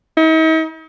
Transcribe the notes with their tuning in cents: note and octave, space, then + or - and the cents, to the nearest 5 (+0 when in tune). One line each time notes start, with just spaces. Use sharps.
D#4 +45